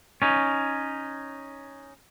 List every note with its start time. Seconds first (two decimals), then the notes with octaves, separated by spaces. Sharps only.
0.22 C#4 D#4